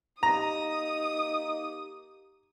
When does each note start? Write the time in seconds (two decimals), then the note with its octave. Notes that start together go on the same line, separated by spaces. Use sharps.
0.23 A#3 D#4 G4 A#5 D#6